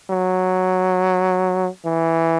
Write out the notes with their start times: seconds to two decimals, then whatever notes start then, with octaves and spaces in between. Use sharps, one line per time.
0.11 F#3
1.85 E3